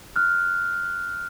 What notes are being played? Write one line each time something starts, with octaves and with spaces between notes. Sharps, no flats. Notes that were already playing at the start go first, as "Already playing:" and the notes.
F6 F#6